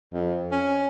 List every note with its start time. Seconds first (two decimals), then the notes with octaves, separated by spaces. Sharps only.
0.13 F2
0.52 C#4